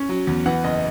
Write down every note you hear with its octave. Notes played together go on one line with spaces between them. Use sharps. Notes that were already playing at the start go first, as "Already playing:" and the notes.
Already playing: C#4
F#3
E2
E3 F#5
F#1 D#5